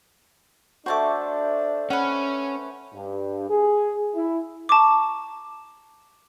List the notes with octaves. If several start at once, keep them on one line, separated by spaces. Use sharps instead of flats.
A3 D4 F#4 C5 A5 D6
C#4 B4 F#5
G2
G#4
E4
A5 A#5 C#6 D6